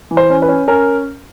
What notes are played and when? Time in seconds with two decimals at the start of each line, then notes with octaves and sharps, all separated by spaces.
0.11 E3
0.17 C5
0.30 C#4
0.42 B4
0.48 C#4
0.68 C#4 A#4